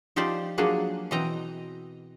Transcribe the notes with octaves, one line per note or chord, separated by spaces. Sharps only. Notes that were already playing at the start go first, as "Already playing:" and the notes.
F3 D#4 F4 G4 C5 D5
F3 F#3 A#3 D4 F#4 G#4
B2 E3 C4 D#5 G5 A#5